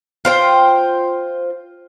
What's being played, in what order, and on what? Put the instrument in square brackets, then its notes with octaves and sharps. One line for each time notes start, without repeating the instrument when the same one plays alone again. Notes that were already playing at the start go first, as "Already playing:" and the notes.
[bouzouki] F4 C5 G5